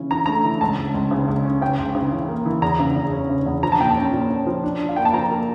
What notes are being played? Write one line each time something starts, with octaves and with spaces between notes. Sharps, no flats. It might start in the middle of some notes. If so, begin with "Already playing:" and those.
Already playing: C#3 E3 C#4
E3 A#5
A3 A#5
E3
C#2 A5
C#2
C#2
C#3
C#2
C#4
C#3 G5
C#2
C#3
E3
A#3
E3
E2 A#5
C#3
E2
C#4
C#3
E2
F3 A#5
A5
A#2 G5
A5
C#4
A#2
C#4
F3
D4
D4
F5
A#3 G5
A5
F3 A#5
A#3